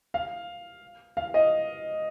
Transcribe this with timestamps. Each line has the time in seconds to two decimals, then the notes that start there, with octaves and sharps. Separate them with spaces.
0.14 F5
1.17 F5
1.34 D#5